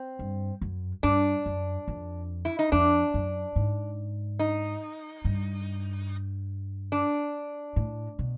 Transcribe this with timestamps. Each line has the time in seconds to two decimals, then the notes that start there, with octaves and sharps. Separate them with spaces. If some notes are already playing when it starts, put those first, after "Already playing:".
Already playing: C4
0.19 G2
0.61 F#2
1.03 G2 D4
1.46 F#2
1.88 F2
2.45 E4
2.59 D#4
2.72 F2 D4
3.14 F#2
3.56 G#2
4.39 D#4
5.25 G2
6.92 D4
7.76 A2
8.19 B2